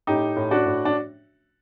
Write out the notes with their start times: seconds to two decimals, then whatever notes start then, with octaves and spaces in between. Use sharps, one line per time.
0.07 A2 D#4 G4
0.36 A2
0.51 D4 F#4
0.66 A2
0.85 D4